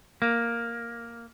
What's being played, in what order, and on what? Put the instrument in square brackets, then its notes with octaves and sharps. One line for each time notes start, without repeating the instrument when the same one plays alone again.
[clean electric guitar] A#3